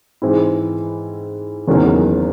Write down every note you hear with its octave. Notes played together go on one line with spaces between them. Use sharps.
G#2 E3 C4 E4
F#1 E2 D#3 F#3 C#4